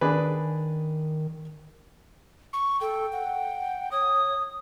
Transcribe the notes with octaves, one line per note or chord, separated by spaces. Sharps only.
D#3 D4 G#4 B4
C#6
A4 G5
F#5
C#5 D#6